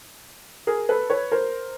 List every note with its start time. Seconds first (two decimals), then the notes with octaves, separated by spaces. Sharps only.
0.67 G#4 A#4
0.89 A4 B4
1.10 B4 C#5
1.32 A#4 C5